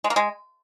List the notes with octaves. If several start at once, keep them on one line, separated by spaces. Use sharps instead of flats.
G#3
A#3
G#3